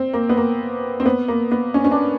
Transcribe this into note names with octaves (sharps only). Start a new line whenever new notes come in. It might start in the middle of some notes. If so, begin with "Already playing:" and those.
Already playing: C4
A#3
B3
A#3
C4
B3
A#3
B3
C#4
C#4
D4